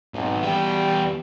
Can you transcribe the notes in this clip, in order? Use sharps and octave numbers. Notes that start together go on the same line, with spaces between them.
B1 G#2 D#3
E2 G3 G5